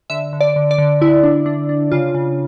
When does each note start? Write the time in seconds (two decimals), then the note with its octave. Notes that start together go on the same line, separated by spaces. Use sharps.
0.10 D3 E5
0.33 D3
0.41 D5
0.56 D3
0.71 D5
0.78 D3
1.01 D3 E4
1.23 D4
1.46 D4
1.69 D4
1.92 C#3 F4
2.15 C#3